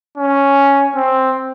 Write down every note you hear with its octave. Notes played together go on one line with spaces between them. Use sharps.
C#4
C4